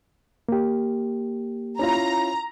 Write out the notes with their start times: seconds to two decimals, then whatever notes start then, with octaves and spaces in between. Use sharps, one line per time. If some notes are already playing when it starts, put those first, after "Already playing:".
0.49 A#3 G4
1.79 C#4 E4 F4 A#5